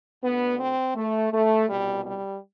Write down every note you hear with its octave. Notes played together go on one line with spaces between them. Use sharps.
D2 D3 B3
C4
A3
A3
C2 B2 G3
G3